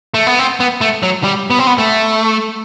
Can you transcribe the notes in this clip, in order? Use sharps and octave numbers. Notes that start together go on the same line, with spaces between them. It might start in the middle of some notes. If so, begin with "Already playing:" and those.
A3
B3
C4
B3
A3
F#3
G3
B3
C4
B3
A3